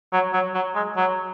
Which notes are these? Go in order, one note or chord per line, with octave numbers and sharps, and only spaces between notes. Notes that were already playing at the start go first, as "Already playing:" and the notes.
F#3
F#3
F#3
G#3
F#3